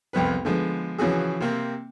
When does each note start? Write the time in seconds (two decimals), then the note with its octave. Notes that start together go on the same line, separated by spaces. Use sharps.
0.13 C2 F2 B3 B4
0.45 D3 F3 G#3 B3
0.98 C#3 E3 F3 C#4 F#4 G#4
1.41 C3 A#3 C4